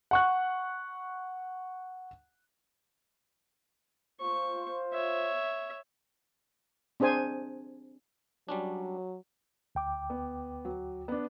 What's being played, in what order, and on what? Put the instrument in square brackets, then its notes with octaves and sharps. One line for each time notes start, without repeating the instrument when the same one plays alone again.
[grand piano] F#5 C#6 F#6
[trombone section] F4 C5 [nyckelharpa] C#6
[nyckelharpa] C#5 E5
[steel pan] C4 D4 G#4 C5 G#5
[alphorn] F#3 [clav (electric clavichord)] G3 C#4 D4
[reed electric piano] D2 G5 D6
[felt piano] B3
F#3
B3 D4